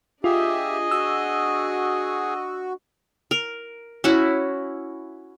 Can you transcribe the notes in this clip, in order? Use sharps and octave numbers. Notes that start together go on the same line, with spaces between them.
D4 F4 G4 G#4 D#5 E5
F#4 E6
A#4
C#4 E4 F#4